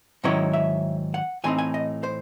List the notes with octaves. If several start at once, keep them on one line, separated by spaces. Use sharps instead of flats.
G#2 D#3 F#3 C#4 E4 C#5
E5
F#5
A2 E3 C4 D#4 G#5
G#5
D#5
C5